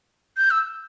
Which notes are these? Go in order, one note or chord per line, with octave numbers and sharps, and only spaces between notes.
G6
E6